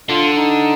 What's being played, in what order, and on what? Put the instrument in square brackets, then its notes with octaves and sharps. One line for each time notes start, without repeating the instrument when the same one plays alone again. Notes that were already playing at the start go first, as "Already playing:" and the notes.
[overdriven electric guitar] D3 [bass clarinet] F4
[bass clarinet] D#4